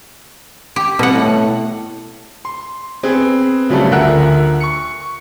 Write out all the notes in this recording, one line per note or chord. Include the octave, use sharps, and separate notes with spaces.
G4
C2 B2 F#5
A2
C6
B3 C4 G#4 B4
C#3 F#3 G3 A3 A4
D2 F4 A#4 E5 F#5 F#6
C#6 C#7